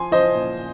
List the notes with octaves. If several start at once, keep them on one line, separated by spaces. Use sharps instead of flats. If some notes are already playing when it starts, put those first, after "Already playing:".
Already playing: F3 G#5 C6
F3 C5 D#5
A#2